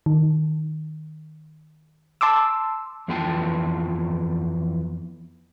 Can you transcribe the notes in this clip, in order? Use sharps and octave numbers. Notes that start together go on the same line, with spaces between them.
D#3
A5 C6 D6 E6
F2 E3 B3 F4 G5 A5